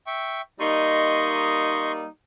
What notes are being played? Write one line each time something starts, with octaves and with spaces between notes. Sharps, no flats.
E5 G5 C#6
G3 A#3 D#4 D#5 C6 C#6